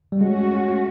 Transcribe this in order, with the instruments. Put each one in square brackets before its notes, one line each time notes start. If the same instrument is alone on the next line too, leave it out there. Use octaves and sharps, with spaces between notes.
[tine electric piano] G3
[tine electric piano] G#3 [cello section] A3 C#4 F#4